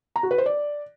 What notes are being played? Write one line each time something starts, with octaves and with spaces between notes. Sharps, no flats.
A#5
F#4
B4
C5
D5